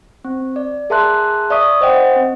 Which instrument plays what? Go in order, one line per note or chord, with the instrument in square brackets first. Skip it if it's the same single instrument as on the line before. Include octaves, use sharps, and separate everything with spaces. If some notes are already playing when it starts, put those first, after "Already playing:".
[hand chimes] C4
D5
G#4 A#4 E5 A5 C6 F#6
D5 E5 C#6 D#6 B6
C5 D#5 F#5 G5
C4